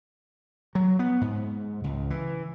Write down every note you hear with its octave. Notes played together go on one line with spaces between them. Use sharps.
F#3
B3
G#2
C#2
E3